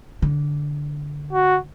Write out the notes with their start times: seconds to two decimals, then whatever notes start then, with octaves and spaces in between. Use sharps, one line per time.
0.22 D3
1.33 F#4